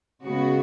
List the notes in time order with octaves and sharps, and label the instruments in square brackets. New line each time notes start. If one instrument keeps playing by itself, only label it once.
[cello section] C#3 G#3 B3 F#4